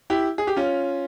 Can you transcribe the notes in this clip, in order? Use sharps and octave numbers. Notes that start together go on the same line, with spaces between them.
E4 G4
G#4
G4
C#4 F4